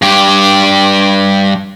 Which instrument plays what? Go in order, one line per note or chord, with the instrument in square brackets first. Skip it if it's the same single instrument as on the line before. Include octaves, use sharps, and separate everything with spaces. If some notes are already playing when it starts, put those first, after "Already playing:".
[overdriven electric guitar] G2 G4